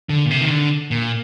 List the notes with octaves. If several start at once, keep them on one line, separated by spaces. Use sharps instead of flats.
D3
A#2
C3
D#3
D3
A#2